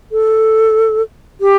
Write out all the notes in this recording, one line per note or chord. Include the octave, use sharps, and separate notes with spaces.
A4
G4